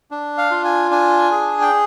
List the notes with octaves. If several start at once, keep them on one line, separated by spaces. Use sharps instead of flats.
D4
F5
F4
G#5
D4 G#5
G#4
G5